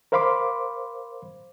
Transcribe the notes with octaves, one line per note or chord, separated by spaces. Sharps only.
A#4 C5 F5 B5 C6 D6